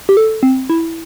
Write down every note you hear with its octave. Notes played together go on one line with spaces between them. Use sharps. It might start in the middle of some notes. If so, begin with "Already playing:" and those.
G4
A4
C4
E4